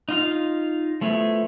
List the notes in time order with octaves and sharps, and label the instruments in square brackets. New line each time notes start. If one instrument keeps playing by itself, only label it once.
[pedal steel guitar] D#4 F4 F5
F3 A3 B3 E4